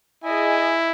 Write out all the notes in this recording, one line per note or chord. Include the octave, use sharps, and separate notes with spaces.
E4 G#4 D#5 G#5